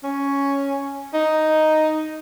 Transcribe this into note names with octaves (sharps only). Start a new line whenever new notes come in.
C#4
D#4